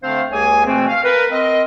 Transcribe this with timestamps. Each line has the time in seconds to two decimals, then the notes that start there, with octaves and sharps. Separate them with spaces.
0.03 D3 A3 C4 D4 C5 F5
0.32 C#2 A#3 G4 G#4 C#5 G#5
0.66 B2 E3 A3 C4
0.88 F5
1.04 A#4 B4
1.31 C4 A#4 D#5